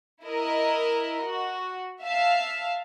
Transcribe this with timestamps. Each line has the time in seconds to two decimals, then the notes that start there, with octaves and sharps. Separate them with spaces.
0.22 E4 A#4 D#5
1.23 F#4
2.01 E5 F5 A5